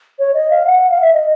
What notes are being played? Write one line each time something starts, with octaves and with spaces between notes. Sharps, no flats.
C#5
D#5
F5
F#5
F5
E5
D#5